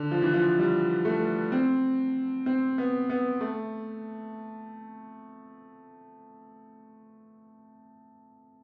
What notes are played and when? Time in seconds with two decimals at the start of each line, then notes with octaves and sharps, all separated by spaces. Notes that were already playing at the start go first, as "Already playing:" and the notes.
Already playing: D3
0.11 F3
0.22 E3
0.34 F3
0.59 G3
1.05 A3
1.52 C4
2.46 C4
2.78 B3
3.10 B3
3.41 A3